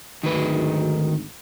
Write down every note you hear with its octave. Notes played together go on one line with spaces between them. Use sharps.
G#1 D2 D#3 B4